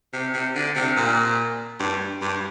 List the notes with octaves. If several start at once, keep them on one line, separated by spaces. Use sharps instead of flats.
C3
C3
D3
C3
A#2
G2
G2